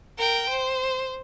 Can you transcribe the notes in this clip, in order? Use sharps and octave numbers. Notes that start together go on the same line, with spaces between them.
A#4 G5
C5